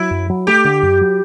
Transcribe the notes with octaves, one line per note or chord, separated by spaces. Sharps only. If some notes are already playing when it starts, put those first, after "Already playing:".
Already playing: F#3 E4
F#2
F#3
A3 G4
D3
F#2
F#3